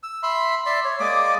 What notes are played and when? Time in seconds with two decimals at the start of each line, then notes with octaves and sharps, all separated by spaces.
0.03 E6
0.23 E5 B5 C6
0.66 D5 E5 C6
0.85 C#5
1.00 G#3 A#3 D5 D6